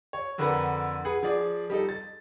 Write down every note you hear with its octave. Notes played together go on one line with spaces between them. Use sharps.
C#5
F2 D3 D4 A#4 B4 F#5
G#4 B4 F#5
F3 G#4 D5
G3 D#4 A4
A6